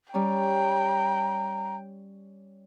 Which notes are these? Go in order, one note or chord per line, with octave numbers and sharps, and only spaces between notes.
G3 C#4 G5 A#5